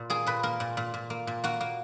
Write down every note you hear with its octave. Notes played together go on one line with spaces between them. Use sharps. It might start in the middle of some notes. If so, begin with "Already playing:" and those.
Already playing: A#2
A#3 G#4
A#2 B4
A#3 A#4
A#2
A#2
A#2
A#3
A#2
A#3 F#4
A#3